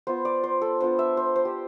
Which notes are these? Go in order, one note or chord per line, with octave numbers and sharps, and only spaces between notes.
B3 F4 C5
D5
C5
A4
B3 D4 F4 C5
E5
C5
C5
G4